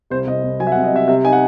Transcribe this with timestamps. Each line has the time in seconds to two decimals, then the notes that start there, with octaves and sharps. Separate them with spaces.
0.10 C2 C5
0.27 C2 D#5
0.44 C2
0.60 F#3 G#5
0.67 E5
0.72 F#5
0.75 C2
0.84 D#5
0.92 C3 E5
1.08 C3 E5
1.24 D#4 G#5
1.33 F#5